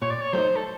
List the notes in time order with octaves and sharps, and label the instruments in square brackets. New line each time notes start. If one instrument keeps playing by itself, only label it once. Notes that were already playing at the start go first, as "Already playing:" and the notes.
[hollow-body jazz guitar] A#2 [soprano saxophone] C#5
[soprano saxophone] D5
C#5
[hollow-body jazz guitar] F#3 A3 C4 D#4 [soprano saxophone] C5
[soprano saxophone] A4